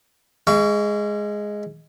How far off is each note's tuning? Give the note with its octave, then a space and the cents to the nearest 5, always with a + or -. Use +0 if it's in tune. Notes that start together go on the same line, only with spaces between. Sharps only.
G#3 +0 F5 -40 C#6 +30